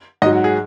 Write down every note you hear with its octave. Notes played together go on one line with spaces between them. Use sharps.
G#2 F#3 D#5
F#4
G#4